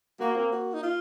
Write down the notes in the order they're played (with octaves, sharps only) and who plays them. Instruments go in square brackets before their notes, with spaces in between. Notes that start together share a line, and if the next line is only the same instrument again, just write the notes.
[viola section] A#3 [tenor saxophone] F#4
[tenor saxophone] C4
F#4
D#4
F4